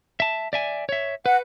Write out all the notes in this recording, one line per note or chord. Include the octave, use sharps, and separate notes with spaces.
E5 A5
D5 E5 G#5
C#5 E5
B4 F#5